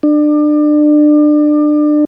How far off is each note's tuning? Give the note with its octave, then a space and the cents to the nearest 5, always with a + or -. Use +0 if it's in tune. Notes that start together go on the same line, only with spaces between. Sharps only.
D4 +30